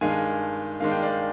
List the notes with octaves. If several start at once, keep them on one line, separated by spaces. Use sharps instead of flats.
G2 D#3 G#3 D4 F5 G#5
G2 D#3 G#3 D4 F5
G5
D5 F5